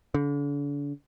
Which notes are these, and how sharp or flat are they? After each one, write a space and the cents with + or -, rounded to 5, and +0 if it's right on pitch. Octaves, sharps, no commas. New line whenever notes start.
D3 -40